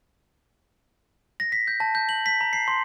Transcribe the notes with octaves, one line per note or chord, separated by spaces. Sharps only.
A#6
B6
G6
A5
G6
F#7
B6
A#5
C7
C6